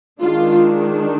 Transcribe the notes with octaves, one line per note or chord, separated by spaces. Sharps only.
D#3 G#3 D4 F4